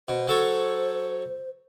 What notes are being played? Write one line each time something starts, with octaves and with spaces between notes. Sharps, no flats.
B2 C5
F#3 A4 C#5